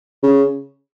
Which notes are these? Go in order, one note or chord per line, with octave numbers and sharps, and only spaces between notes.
C#3